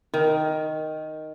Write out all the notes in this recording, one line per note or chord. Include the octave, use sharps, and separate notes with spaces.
D#3